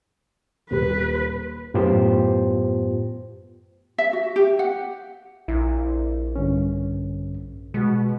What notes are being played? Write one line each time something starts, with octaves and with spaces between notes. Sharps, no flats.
D#1 G4 B4
F#2 A2 B3 F4 G4 C5
E5
F#4
G4
F#5
A#1 E4
G2 D3 C#4
B2 G#3 F#4